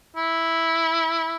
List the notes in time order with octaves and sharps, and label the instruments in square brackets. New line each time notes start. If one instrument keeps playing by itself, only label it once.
[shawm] E4